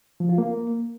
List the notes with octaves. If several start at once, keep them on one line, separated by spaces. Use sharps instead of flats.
F3
F4
A#3